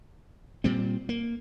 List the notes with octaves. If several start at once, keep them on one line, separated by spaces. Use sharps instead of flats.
A#2 G3 C4
A#3